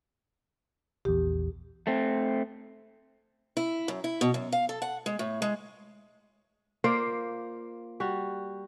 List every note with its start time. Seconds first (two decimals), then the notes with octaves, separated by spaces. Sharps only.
1.05 A#1 E2 G4
1.87 A3 C4
3.57 E4
3.88 F#2
4.04 E4
4.21 B2
4.34 F#2
4.52 F5
4.69 A4
4.82 F#5
5.06 G#3
5.19 A2
5.42 G#3
6.84 A#3 F4 C5 D5
8.00 G3 F#4